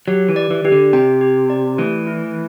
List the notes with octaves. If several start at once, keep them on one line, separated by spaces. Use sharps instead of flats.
F#3 G4
E3
D5
E3
E3 G4
D3
C3 G5
G4
D5
E3 A3
E4